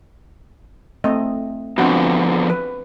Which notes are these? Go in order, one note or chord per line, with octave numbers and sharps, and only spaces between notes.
A3 C4 D#5
D3 F3 B3 C4 D4 F#4
B4